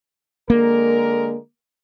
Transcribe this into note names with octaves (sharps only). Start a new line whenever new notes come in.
D3 G#3 A#3 A#4